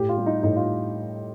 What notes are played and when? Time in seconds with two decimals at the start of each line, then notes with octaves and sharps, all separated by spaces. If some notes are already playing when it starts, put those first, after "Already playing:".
Already playing: A2 G4
0.09 F4
0.17 G3
0.26 D#4
0.43 A2 D#4
0.56 F4